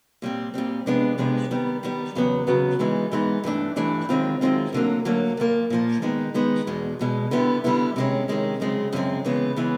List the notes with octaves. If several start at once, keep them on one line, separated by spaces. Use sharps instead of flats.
A#2 G3 C4
A#2 G3 C4
C3 F3 G#3 B3 D4
C3 F3 G#3 B3 D4
D#3 G3 B3
D#3 G3 B3
E2 C#3 F#3 B3
E2 C#3 F#3 B3
G#2 E3 G#3 B3 D#4
G#2 E3 G#3 B3 D#4
G2 E3 A3 D4
G2 E3 A3 D4
F#2 D#3 G#3 C4 F4
F#2 D#3 G#3 C4 F4
D2 D3 F#3 A#3
D2 D3 F#3 A#3
A#2 F3 A#3
A#2 F3 A#3
D#3 G#3 B3 D#4
D#3 G#3 B3 D#4
E2 B2 G#3
E2 B2 G#3
D3 G3 B3 E4
D3 G3 B3 E4
C3 D#3 G#3 C#4
C3 D#3 G#3 C#4
F#2 C#3 F3 G#3 C4
F#2 C#3 F3 G#3 C4
C#3 E3 G#3 B3
C#3 E3 G#3 B3